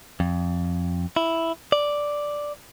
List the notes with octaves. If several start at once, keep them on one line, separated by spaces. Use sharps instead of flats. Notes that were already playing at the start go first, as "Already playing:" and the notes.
F2
E4
D5